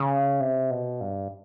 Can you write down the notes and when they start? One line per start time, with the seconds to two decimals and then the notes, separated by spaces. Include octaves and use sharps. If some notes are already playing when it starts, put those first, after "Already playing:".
Already playing: C#3
0.40 C3
0.71 B2
1.01 G2